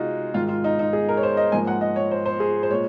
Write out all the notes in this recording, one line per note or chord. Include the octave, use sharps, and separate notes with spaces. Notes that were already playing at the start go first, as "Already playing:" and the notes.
Already playing: C3 G#3 D#4 F4 F#4 G#4
G#2 D#3 G#3 F4
F4
D#4
D#4
G#4
A#4
C#5
C5
D#5
G#2 F3 A#3 G#5
F#5
D#5
C#5
C5
C5
G#4
C5
A#2 G#3 C#5